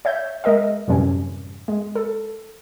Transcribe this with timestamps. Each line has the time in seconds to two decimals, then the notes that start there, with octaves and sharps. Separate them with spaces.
0.05 C#5 E5 G6
0.44 G#3 A#4 D#5 E5
0.88 F#2 A2 C3 E3 G3 C#4
1.68 G#3
1.95 A4